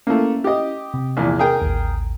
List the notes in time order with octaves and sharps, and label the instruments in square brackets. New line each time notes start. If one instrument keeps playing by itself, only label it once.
[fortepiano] A3 A#3 [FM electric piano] C#4 E4
[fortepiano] G4 D#5
[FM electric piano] C3
[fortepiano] A#1 E2
G#4 A#4 G5
[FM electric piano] A1 D#2